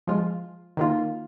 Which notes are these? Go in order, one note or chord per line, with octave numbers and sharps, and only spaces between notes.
F3 G#3 F4
D#3 A#3 F4